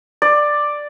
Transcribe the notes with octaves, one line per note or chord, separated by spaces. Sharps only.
D5